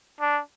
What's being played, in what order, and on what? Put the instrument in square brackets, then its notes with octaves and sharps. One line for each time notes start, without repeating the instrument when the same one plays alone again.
[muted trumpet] D4